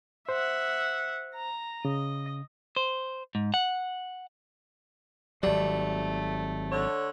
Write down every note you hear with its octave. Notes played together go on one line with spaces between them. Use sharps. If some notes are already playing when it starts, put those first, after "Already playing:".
C5 E5 F#5
A#5
C#3 D#5
C5
G#2
F#5
G#1 F#3 G3 A3
D3 C#5